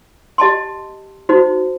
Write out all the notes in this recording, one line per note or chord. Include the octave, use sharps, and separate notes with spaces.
G4 D#5 A5 C6
D#4 F#4 C5